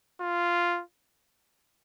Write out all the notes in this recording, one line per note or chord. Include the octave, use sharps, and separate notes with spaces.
F4